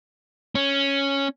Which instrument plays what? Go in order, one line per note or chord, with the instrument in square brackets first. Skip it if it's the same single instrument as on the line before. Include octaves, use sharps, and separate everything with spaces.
[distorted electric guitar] C#4